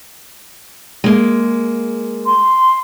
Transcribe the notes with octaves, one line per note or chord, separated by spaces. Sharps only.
G#3 A#3
C6